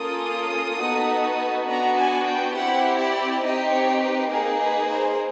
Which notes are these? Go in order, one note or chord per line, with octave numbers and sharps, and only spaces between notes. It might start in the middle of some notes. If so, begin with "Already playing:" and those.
Already playing: A#3 C#4 F4 A4 D#6
B3 D#4 F#4 A4
B3 D4 F#4 A#5
G#5
G5
C4 E4 G4 F#5
D5
C4 D#4 G4 D#5
C#5
B4
A#3 D#4 G#4 A#4
B4
C5